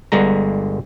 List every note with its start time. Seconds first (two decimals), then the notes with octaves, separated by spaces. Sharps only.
0.12 G1 G2 D3 G#3 A#5